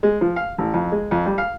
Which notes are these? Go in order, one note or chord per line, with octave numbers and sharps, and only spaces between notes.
G#3
F3
F5
A1
F2
G#3
F2
G3
F5